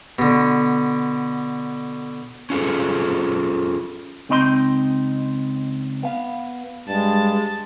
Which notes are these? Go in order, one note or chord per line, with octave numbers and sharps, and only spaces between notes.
B2 D3
C#4 F4 G#4 A4 C5
C#2 C4 D#4 D#5 B5 C6
B3 F5
G2 G#3 A5 A6